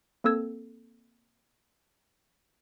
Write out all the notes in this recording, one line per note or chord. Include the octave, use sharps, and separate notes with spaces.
A#3 C4 A4 E6 G#6